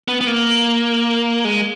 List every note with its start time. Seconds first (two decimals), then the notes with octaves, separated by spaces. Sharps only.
0.08 B3
0.21 B3
0.27 A#3
1.45 G#3